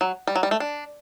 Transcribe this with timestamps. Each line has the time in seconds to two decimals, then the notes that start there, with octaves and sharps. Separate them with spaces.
0.01 F#3
0.27 G3
0.36 F#3
0.43 G3
0.51 A3
0.60 D4